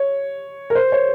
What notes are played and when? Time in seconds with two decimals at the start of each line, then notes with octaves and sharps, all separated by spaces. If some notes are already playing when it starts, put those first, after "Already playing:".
Already playing: C#5
0.70 A#4
0.75 C5
0.92 C#5